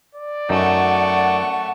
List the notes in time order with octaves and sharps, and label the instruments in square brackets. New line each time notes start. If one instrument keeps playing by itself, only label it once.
[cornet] D5
[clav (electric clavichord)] F#2 D#4 [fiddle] A3 C#6 [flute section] F#5